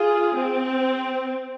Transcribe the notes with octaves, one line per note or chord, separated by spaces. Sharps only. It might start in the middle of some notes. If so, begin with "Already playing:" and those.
Already playing: F4 G#4
C4